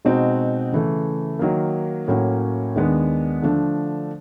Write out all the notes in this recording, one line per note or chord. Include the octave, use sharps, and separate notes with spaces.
B2 G#3 C4 D#4 F#4
C#3 E3 A3
D#3 F#3 A#3
A2 F#3 A#3 C#4
D#2 D#3 G#3 B3 D4
D3 F3 A3 D4